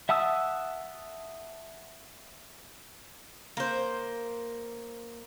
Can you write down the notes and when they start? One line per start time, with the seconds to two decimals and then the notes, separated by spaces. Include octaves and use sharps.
0.09 E5 F#5 A5 D#6 E6
3.57 A#3 C5